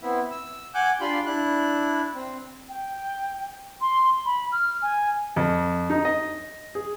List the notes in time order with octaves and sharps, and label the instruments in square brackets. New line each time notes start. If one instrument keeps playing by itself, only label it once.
[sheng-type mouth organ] B3 C4 E4 E5
E6
F#5 G#5 D6 F#6 G6
D4 F4 G4 F5 B5 C6
D4 E4 F#6
C4
[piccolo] G5
C6
B5
F6
G#5
[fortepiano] F2
D#4
D#5
G#4